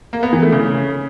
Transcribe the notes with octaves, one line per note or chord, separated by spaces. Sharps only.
A#3
B3
E3
A3
C#3